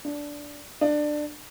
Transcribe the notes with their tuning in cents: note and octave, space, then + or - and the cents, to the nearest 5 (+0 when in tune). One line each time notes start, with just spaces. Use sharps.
D4 -10
D4 +20